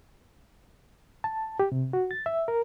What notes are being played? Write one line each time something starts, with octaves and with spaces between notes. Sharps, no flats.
A5
G4
C3
F#4
A6
E5
A#4